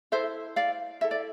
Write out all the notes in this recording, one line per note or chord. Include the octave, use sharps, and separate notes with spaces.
E4 A4 C5 E5
D5 F5
E4 A4 E5
D5